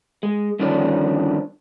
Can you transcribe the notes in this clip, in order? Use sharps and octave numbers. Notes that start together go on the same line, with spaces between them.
G#3
G2 D3 D#3 F3 C#4 D4